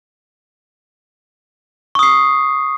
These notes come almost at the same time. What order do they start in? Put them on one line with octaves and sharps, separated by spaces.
C#6 D#6 C7